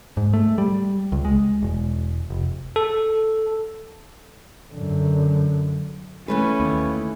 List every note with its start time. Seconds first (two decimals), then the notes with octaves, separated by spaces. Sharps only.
0.17 G#2
0.34 A3
0.58 G3
1.12 C#2
1.25 G#3
1.63 E1
2.30 F1
2.76 A4
4.73 F#2 D3
6.28 E3 A3 C#4 B4
6.60 D#2